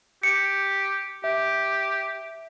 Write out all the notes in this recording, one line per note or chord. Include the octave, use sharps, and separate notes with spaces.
G4 C#7
G4 E5